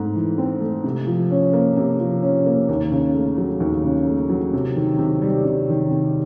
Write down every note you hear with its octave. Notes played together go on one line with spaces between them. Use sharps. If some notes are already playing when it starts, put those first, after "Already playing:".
Already playing: G#2 A3 C4
E3
C4
A3
C3
F3
C#4
A#3
C3
F3
C#4
A#3
D#2
C#3
A3
F#3
D#2
C#3
A3
F#3
C3
D#3
C3
G3
C3
D#3
C3